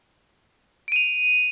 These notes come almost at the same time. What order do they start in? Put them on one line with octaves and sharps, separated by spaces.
D7 D#7 F7